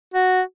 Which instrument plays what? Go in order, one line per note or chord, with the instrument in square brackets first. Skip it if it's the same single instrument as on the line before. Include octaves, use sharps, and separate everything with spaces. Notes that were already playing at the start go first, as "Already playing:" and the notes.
[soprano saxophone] F#4